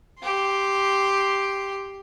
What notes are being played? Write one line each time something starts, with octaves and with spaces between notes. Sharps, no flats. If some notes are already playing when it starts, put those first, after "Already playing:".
G4 C6